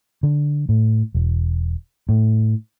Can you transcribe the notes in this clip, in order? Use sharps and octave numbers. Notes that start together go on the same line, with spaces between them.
D3
A2
E1
A2